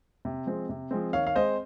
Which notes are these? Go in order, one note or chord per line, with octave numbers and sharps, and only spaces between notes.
C3
F3 G#3 C4
C3
F3 G#3 C4
D#3 C#5 F5
F5
G#3 C4 C5 D#5